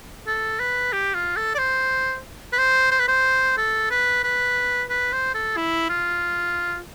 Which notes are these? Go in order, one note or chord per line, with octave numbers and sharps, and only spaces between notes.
A4
B4
G4
F4
A4
D5
C5
B4
C5
C5
B4
C5
A4
B4
B4
B4
C5
A4
E4
F4